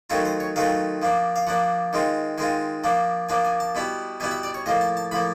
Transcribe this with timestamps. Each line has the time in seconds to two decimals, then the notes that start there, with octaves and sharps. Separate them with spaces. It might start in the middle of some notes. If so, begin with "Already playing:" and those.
0.10 D#3 F#3 A3 C4 F4 C#5
0.25 C5
0.40 C#5
0.56 D#3 F#3 A3 C4 F4 F5
1.02 F3 A#3 D4
1.36 F5
1.47 F3 A#3 D4 F#5
1.93 D#3 G#3 C4 F4
2.38 D#3 G#3 C4 F4 G#5
2.84 F3 A#3 D4
3.29 F3 A#3 D4 G#5
3.45 G#5
3.60 A5
3.75 B2 G3 B3 E4
4.20 B2 G3 B3 E4 G#5
4.31 E5
4.43 D5
4.54 C#5
4.66 A2 F3 A#3 D#5
4.81 A5
4.97 A5
5.11 A2 F3 A#3 B5